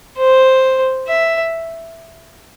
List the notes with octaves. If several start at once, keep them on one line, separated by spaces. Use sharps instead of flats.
C5
E5